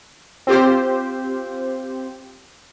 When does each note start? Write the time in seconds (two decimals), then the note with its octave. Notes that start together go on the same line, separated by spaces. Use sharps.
0.47 C4 F4 G4 C5